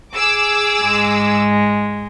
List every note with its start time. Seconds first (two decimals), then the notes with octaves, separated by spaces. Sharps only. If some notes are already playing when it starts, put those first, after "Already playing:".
0.15 G#4 D6 E6
0.83 G#2 G#3